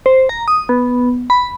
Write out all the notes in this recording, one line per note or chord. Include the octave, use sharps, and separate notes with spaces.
C5
A#5
D#6
B3
B5